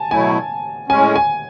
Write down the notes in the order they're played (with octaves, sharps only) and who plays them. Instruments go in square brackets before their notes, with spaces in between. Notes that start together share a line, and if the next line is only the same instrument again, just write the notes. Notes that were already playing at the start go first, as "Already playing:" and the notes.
Already playing: [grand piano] G#5 A5
[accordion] B2 F#3 A3 E4 [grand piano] G#5
[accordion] A2 G#3 C#4 [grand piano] G#5
[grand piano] G#5